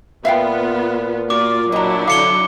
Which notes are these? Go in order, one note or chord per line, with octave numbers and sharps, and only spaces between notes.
A#2 B3 F4 E5 F5 G5
A#3 F4 F#4 D5 D6
F#3 D4 E4 D#5 A#5
D3 F5 D6 C#7 G7